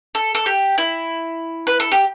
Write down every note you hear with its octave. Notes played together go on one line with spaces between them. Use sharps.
A4
A4
G4
E4
B4
A4
G4